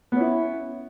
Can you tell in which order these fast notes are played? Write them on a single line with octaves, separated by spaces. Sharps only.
B3 C#4 E4